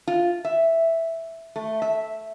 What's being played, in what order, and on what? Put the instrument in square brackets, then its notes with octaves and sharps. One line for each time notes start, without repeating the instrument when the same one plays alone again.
[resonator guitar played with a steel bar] F4
E5
A3
E5